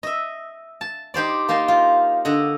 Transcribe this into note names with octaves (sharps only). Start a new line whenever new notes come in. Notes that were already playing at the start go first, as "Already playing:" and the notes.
D#5 E5
A5
D#4 G4 C5 D5
A#3 D#4 D#5 A5 C6
F4
D3 D#5 F#5